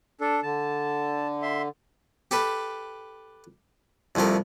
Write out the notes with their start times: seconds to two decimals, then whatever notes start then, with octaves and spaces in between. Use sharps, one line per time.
0.21 D4 A4
0.43 D3 A5
1.42 E5 C6
2.31 G4 A4 B4
4.15 C2 F2 C3 A3 A#4